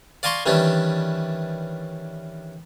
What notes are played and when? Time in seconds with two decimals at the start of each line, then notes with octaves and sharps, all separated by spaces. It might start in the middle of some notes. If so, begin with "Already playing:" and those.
0.23 D5 F5 G#5 A#5 C6 C#6
0.46 D#3 E3 G3 C#4 D4